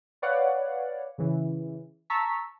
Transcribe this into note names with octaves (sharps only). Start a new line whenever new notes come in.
B4 C#5 D5 F5 F#5
C#3 E3
A5 A#5 C#6 E6 B6